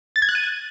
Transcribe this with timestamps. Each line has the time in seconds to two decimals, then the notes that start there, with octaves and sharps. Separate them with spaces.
0.16 A6
0.22 G#6
0.29 F#6
0.35 D#7